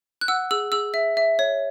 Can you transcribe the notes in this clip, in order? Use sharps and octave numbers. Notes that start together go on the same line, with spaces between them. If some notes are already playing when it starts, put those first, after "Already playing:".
F#6
F#5 E6
G#4 E6
G#4 E6
E5
E5
C#5